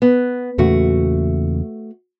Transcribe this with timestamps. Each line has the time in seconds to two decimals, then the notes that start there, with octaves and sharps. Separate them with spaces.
0.02 B3
0.58 E2 A#2 C#3 A3 F#4